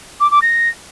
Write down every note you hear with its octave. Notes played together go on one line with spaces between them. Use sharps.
D6
D6
A#6